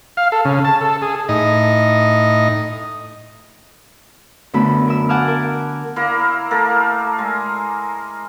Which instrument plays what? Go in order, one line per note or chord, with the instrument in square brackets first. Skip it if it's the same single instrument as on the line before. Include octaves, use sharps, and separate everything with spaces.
[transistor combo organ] F5
A4
C#3
A5
A4
G#4
A2 D#4 D#5
[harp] F#2 D3 A3 B3 B5
A#4 B5 E6
F#5 G#5 A5 D6 E6 F6
A#4
[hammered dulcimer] A#3 E4 A#4
A3 A#3 A4 A#4
G#3